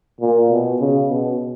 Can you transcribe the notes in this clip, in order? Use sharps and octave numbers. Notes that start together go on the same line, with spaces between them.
A#2
B2
C#3
B2